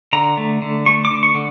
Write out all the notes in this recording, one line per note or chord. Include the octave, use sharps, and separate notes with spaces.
D3 A#5
A3
D3
A3 C#6
D6
D3
C#6
D3